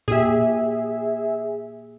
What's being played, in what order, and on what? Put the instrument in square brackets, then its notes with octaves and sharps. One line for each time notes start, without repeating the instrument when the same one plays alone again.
[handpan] A#2 G4 [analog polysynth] G#4 E5